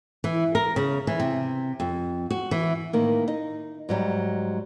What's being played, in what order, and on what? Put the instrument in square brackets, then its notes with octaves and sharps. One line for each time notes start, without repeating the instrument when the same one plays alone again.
[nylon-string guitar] E3
A#4
C#3
E3
C3
F2
F#4
E3
A2 D#3 A#3
D#4
G#2 F#3 G3